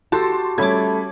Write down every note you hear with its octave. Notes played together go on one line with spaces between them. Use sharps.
F#4 G4 A4 A5 C6
G3 A3 C#4 A4 B5 D6 G#6